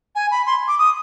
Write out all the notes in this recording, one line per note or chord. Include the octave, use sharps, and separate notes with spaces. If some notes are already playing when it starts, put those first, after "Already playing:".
G#5
B5
C6
D6
D#6